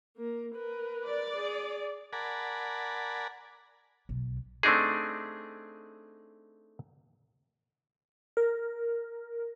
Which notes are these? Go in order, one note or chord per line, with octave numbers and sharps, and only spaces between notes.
A#3 A#4
A#4 B4
D5
G#4
A#4 D5 F#5 G#5 A5 B5
B1
A3 C4 D4 D#4 G#4
A#4